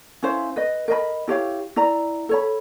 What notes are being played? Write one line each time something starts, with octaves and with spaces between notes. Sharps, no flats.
C#4 E4 C5 F5
B4 D#5
A#4 D#5 B5
E4 G4 C#5 F5
E4 D5 A#5
A4 C#5 B5